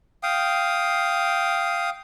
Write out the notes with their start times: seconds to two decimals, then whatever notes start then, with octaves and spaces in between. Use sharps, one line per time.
0.23 F5 G5 D#6